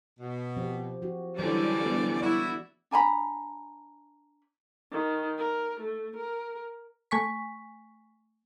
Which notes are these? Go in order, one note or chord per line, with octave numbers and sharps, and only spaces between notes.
B2
F3 C4 G4
F3 F#4
D3 E3 F#3 G3 C#4 D5
A3 B3 D4
E4 F#4 D5
D4 G#5 A#5 B5
D#3
A#4
A3
A#4
A3 G#5 C#6 B6